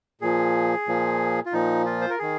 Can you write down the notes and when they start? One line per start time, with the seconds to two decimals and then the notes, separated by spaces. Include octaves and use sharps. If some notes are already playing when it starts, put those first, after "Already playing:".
0.21 A#2 F3 G#4
0.87 A#2 F3
1.46 F4
1.53 A#2 F3 D#4
1.86 F4
2.02 C5
2.10 A#4
2.19 D#3 G#4